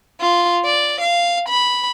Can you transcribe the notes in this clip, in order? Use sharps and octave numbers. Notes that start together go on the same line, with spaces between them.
F4
D5
F5
B5